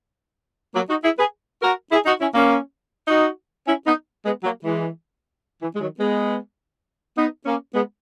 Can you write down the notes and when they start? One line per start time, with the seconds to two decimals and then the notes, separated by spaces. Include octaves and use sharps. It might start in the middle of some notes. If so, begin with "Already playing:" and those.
0.75 F#3 A#3
0.89 D#4 F#4
1.04 E4 G#4
1.19 G#4 B4
1.63 F#4 A#4
1.91 E4 G#4
2.06 D#4 F#4
2.21 C#4 E4
2.35 A#3 C#4
3.08 D#4 F#4
3.67 C#4 E4
3.86 B3 D#4
4.25 G#3 B3
4.44 F#3 A#3
4.64 E3 G#3
5.61 E3
5.75 G#3
5.81 D#3 F#3
6.00 G#3 B3
7.16 B3 D#4
7.46 A#3 C#4
7.75 G#3 B3